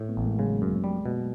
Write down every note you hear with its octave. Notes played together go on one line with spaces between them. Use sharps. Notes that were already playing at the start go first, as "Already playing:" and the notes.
Already playing: A2
A3 B3
A1
G#3 A#3
C#3 F#3 G#3
F#2
G3
B2